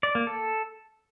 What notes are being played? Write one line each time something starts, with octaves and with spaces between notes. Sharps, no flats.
D5
A#3
A4